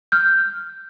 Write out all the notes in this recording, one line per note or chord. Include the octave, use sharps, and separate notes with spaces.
F6 G6